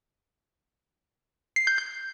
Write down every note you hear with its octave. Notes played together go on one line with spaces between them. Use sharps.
C7
G6
G6